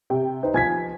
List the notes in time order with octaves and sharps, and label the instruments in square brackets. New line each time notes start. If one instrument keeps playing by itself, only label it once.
[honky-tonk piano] C3 G5
[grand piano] D#4 B4 C5
[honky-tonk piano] F3 [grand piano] G#5 G#6 B6